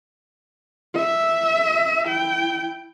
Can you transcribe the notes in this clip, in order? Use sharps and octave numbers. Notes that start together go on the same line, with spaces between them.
E5
E4 G5